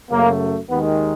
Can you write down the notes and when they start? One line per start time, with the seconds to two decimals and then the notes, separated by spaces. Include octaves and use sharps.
0.10 F#2 C#3 F#3 A3 A#3
0.69 D#2 D#3 G#3 B3